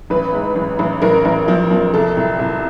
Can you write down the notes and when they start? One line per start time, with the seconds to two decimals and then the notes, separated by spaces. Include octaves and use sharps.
0.10 A1 B4
0.33 G#2
0.56 A1
0.79 A1
1.02 A1 A#4
1.25 A1
1.48 F3
1.71 F3
1.94 C2 A4
2.17 C2
2.39 C2